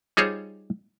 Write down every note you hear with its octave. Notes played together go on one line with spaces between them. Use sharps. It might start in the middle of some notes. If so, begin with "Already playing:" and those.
G3 D#4 F4 G#4 C5 C#5